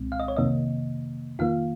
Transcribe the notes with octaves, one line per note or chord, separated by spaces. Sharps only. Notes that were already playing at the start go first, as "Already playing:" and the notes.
Already playing: C2 A#2 G#3 C4
F5
D#5
C#5
F2 C3 D#3 A#3 D#5
F2 D#3 A#3 F4 F5